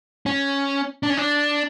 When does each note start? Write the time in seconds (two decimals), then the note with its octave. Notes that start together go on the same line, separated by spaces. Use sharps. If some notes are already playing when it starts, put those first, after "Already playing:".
0.26 C#4
1.03 D4
1.10 C#4
1.17 D4